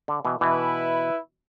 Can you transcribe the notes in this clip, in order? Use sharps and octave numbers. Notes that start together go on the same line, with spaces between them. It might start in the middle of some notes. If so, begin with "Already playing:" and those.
D3
B2 E3
B2 E3 E4 B4 E5